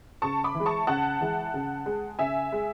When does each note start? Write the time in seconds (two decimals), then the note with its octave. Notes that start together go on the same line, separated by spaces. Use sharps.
0.22 C#3 A5 C#6
0.44 B5 D6
0.55 E3
0.60 G#3
0.66 A5 C#6
0.87 C#3 F#5 A5
1.21 E3 G#3
1.54 C#3
1.86 G#3
2.19 C#3 E5 G#5
2.52 G#3